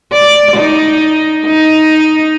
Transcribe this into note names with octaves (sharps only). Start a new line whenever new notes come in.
D5
D#4
D#4